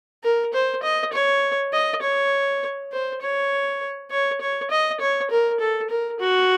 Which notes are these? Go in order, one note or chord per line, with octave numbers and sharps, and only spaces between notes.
A#4
C5
D#5
C#5
D#5
C#5
C5
C#5
C#5
C#5
D#5
C#5
A#4
A4
A#4
F#4